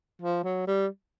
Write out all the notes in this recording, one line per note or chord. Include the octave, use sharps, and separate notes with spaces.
F3
F#3
G3